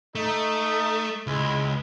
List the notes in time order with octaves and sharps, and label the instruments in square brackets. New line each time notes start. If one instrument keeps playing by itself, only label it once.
[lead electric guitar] A3 [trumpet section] D#4
[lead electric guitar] C#2 [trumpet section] G#3 E4